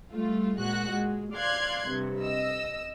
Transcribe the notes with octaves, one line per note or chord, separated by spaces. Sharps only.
G3 A3 F4
A#2 G#3 F#4 F#6
G#3
D5 F5 C6 F#6 G#6
G2 C3
D#5 E6